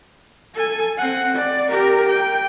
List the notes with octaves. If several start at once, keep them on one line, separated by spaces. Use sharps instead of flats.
A4 G#5
C4 F#5
D5
G4 A#4
G5